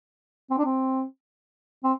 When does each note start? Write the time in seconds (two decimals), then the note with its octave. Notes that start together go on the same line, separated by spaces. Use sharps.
0.50 C4
0.58 D4
0.66 C4
1.84 C4